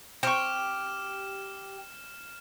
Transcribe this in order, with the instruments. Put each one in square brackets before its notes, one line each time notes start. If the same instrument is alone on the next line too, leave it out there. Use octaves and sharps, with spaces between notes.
[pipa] C4 C#6 [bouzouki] G4 [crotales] F6 E7